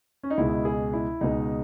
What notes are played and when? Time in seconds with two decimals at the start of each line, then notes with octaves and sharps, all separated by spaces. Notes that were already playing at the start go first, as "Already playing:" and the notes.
0.23 C#4
0.30 D#4
0.37 C#2 B2 G#3 E4
0.65 G#4
0.93 E4
1.21 C#2 B2 G#3 D#4